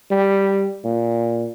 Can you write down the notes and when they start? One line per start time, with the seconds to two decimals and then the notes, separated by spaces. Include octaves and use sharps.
0.11 G3
0.84 A#2